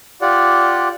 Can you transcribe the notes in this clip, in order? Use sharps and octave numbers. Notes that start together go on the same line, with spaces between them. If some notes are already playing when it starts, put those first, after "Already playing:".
F4 G4 D5 F#5